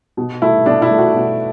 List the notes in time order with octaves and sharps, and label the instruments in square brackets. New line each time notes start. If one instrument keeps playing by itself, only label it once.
[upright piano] B2
A3 E4
B2 D4
E4
A3
F#4
B2